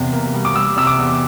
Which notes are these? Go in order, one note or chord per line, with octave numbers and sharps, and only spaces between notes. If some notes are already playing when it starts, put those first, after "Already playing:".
Already playing: E2 C3
A#3
G3
D6
G3 E6
C3 E6
D6
E2